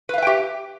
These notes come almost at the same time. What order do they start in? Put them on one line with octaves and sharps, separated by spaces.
B4 F5 E5 G5 G4